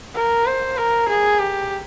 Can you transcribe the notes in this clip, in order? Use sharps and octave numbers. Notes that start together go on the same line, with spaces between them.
A#4
C5
A#4
G#4
G4